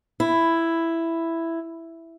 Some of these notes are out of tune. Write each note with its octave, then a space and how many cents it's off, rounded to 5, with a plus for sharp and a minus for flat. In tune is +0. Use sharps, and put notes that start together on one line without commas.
E4 +5